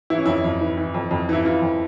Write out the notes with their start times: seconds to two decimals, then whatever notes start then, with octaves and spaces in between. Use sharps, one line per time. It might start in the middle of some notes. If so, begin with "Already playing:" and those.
0.10 E3 E4
0.18 C#4
0.26 F2 E4
0.44 F2
0.61 E3
0.77 E3
0.94 F2
1.11 F2
1.29 E3 E4
1.45 E3 F4
1.62 F2